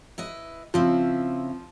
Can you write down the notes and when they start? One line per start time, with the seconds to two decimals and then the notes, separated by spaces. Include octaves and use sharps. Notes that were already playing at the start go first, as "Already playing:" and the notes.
0.18 E4 B4 D#5
0.74 C#3 F3 C4 E4